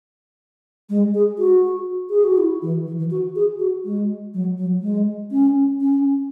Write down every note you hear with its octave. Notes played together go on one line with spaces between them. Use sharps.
G#3
G#4
F#4
G#4
F#4
E4
E3
E3
E3
F#4
G#4
F#4
G#3
F#3
F#3
G#3
C#4
C#4